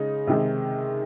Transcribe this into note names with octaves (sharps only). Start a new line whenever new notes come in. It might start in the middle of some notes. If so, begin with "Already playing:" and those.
Already playing: C#3 G#3 D#4
C3 D#3 G#3